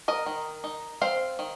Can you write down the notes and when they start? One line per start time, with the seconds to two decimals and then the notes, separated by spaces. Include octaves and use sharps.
0.08 A#4 D#5
0.26 D#3
0.64 D#4
1.01 C4 C5 F5
1.39 D#3